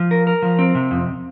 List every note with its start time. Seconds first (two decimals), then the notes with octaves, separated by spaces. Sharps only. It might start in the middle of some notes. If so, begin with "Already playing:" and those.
Already playing: F3
0.11 A#4
0.27 A#4
0.42 F3
0.59 C4
0.75 C3
0.91 F2